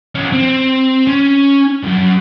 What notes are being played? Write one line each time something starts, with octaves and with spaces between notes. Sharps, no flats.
F3 C#4
C4
C#4
C2 F#2